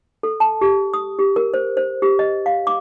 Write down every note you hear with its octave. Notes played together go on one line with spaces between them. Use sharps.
A4
A5
G4
D#6
G4
A#4
C5
C5
G4
D#5
F5
D6